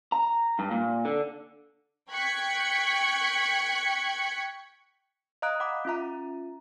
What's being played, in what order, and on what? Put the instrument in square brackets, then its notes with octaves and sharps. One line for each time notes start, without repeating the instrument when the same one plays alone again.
[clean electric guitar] A#5
G2
A#2
D3
[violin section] G5 C#6 F#6 G#6 B6 C#7
[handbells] D#5 F5 A#5 D#6 F#6 D7
F#5 B5 D6
C#4 F4 E5 A#5